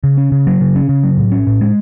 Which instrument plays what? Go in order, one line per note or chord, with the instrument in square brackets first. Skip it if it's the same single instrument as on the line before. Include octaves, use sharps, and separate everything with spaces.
[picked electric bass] C#3
C#4
C#3
F#3
C#3
C#4
C#3
F#3
A2
C#4
A2
G#3